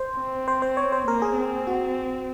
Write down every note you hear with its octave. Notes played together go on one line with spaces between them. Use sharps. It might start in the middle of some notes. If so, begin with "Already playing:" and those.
Already playing: C5
C4
C5
C5
C#5
C5
A#3 A#4
G#4
C4
F#4